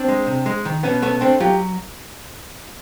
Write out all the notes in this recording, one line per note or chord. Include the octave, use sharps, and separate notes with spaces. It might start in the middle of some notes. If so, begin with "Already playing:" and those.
Already playing: C4 D4
G#3
C3
G#3
D#3
B2 B3 C#4
A3 B3 C#4
A3 C4 D4
F#3 F4 G4